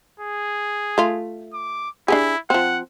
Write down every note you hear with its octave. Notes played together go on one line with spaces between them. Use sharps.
G#4
A3 F4
D6
D4 E4 G4 G#4
F3 C4 F#5